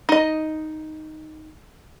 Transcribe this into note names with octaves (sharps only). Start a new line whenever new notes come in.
D#4 D#5